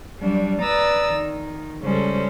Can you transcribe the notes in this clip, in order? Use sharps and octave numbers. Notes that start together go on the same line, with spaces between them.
F#3 G3 D4
B4 D5 A#5 D#6 E6 A6
D#3
C#3 G3 G#3 C#4 A4 C5